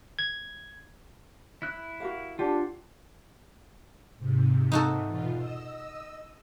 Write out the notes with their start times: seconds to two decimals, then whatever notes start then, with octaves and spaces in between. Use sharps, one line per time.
0.19 G#6
1.62 E4 F#6
2.00 F#4 A#4 F5
2.39 D4 F4 G4 F#5
4.18 G#2 C3
4.72 D#4 F#4 A4
5.06 E2 B2 F4
5.36 D#5 E6